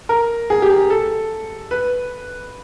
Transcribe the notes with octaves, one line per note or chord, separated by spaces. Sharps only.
A#4
G#4
G4
G#4
A4
B4